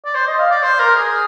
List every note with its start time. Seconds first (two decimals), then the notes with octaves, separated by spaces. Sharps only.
0.05 D5
0.15 C5
0.27 D#5
0.39 F5
0.51 D5
0.63 C5
0.80 A#4
0.95 G#4